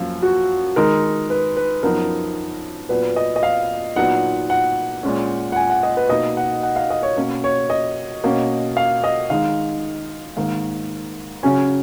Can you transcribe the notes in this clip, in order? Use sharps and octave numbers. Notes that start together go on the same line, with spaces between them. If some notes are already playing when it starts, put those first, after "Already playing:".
Already playing: F#2 F3 A#3 F4
F#4
D#3 G#3 D#4 A#4
B4
B4
F#2 F3 B3 D#4 A#4
A#2 F#3 B3 B4
D#5
D#5
F5
A#2 F#3 B3 D#4 F#5
F#5
A#2 G#3 C#4
F#5
G#5
F#5
D#5
B4
B2 A#3 D#4 D#5
F#5
F#5
F5
D#5
C#5
B2 A#3 C#4
C#5
D#5
B2 A#3 C#4
F5
D#5
D#3 G#3 D#4 F5
G#2 D#3 A#3 F5
C#3 F#3 C#4 G#5